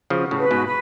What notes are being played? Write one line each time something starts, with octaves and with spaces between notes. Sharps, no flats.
C#3 F3 F#4
A2 C#3
B4
G#2 B2
B4